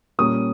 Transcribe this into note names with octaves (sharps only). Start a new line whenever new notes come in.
A#2 G3 A#3 C#4 D#6